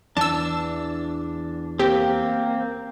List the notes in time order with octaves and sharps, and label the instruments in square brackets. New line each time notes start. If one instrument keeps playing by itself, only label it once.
[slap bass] E2 E3 [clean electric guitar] D4 [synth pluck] A5 E6
[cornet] A#3 [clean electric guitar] C4 [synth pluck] G4